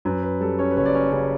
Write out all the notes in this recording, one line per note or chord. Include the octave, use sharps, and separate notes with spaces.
F#2 B4
B4
G3 A4
C#4 C#5
B4
F#1 C#4 C#5
D5
C#4 C#5
C#3 C#4 C#5